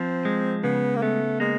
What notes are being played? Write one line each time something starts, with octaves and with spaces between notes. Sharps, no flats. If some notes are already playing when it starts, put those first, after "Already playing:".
Already playing: F3 C4
G#3
C#3 B3
A#3
A3 B3
G#3 A#3